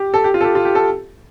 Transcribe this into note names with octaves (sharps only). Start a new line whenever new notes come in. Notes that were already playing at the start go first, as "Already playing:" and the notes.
Already playing: G4
A4
G4
F4
A4
G4
F4
G4
A4